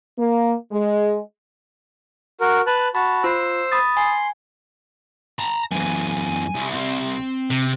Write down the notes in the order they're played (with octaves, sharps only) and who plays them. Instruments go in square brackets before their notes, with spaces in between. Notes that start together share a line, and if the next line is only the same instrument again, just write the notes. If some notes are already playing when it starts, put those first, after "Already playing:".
[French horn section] A#3
G#3
[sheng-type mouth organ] F#4 A#4
B4 A5 F#6
[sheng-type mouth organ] F#4 A5 [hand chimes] B5
[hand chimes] F4 [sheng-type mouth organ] C5 E6
[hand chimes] B5 D#6 A6
[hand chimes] G#5 [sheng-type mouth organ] C6
[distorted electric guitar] A5 A#5
[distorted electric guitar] F#2 E3 [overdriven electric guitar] G#5
[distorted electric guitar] C2
[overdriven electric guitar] C4
[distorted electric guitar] C3